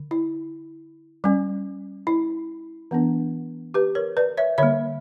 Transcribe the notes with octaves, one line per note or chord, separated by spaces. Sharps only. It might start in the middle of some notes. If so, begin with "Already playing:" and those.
Already playing: D3
E4
G3 C#4
E4
E3 B3 D4
G4 B4
A#4 C#5
B4 D5
C#5 E5
D3 G3 A#3 C#5 E5